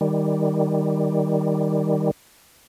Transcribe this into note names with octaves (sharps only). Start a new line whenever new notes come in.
D#3 G3